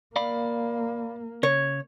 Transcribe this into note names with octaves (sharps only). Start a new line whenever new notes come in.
A#3 D5 F5 B5
C#3 C#5